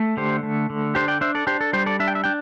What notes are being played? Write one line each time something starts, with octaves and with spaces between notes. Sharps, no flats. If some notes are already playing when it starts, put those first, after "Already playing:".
Already playing: A3
D3 G4 C5
A3
D3
D4 G4 C5
D5 G5
D4 C5 E5
A4 D5
D4 G4 C5
A4
G3 G4 C5
A4 D5
D4 E5
G5
E5
D4 G5